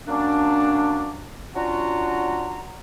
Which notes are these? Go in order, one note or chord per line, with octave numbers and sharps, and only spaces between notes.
F#3 A#3 C#4 D4
C#4 D4 F4 F#4 F#5 A#5